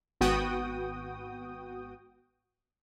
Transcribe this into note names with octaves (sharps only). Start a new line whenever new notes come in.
G#1 B3 F#4 G5 D#6